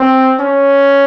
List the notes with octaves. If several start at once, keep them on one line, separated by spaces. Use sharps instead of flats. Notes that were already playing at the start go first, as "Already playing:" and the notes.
Already playing: C4
C#4